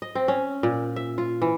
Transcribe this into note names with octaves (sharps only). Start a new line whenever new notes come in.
D#5
C4
C#4
A#2
E5
F4
E3